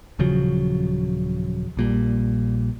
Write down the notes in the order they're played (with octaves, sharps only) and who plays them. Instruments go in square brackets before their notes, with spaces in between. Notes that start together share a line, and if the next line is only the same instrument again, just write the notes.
[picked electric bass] D#1 C#3 F3 F#3
A#1 A#2 G3